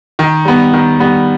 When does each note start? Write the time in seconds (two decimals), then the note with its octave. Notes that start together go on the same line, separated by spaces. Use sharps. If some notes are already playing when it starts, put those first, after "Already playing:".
0.19 D#3
0.45 G3 B3
0.73 D#3
1.00 G3 B3